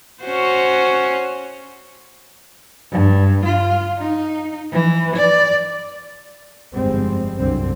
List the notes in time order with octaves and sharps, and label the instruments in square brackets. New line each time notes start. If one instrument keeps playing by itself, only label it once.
[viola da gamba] C#4 F#4 C5
[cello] G2
F4
D#4
E3
D5
[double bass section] G1 F2 G#2 G3 G#3 C4
C2 F#2 D3 C4